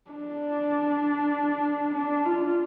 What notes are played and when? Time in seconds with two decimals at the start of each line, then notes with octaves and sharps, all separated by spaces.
0.11 D4
1.95 D4
2.25 F4